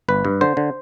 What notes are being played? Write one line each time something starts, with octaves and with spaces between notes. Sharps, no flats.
G1 B4
G2
D3 C5
D3